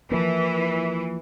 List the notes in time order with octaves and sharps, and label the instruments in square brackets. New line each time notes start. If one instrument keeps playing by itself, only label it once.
[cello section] E3 [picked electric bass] F3 A#3